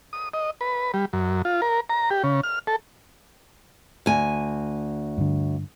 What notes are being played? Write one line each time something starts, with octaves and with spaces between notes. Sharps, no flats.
D#6
D#5
B4
G3
F#2
F4
A#4
A#5
G4
C#3
F6
A4
D2 G#5
G2 D3